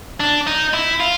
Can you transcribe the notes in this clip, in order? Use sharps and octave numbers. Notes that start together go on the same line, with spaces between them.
D4
D#4
E4
F4